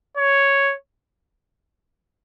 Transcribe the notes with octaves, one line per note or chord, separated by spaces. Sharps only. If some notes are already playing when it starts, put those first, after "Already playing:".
C#5